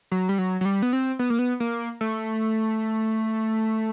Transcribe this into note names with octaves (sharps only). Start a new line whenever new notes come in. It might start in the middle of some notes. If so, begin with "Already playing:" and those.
F#3
G3
F#3
F#3
G3
B3
C4
B3
A#3
B3
A#3
A3